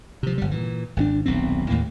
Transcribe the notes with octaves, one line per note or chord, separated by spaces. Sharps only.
C3 F3
G1 G3
A#2 E3
G#1 E3 D4
D#1 B1 B2 C4
D#2 A2 A#3